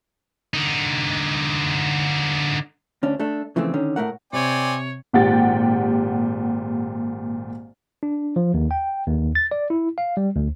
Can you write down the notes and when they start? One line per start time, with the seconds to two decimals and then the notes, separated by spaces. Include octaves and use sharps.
0.54 D3 D#4
3.03 D2 C#4 D4
3.19 A3 D4 A4
3.56 C#3 E3 F3 A3 C4
3.74 D3 D#3 C#4
3.96 A2 A3 A#4 F#5
4.33 C3 C4 C#5 D5 G#5
5.13 G#1 A#2 G4 F#5 G5 A6
8.03 D4
8.36 F3
8.54 D#2
8.71 G5
9.06 D#2
9.35 A6
9.51 D5
9.70 E4
9.98 F5
10.17 G3
10.36 D2